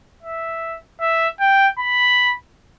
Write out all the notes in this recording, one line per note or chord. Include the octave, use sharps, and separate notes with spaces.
E5
E5
G5
B5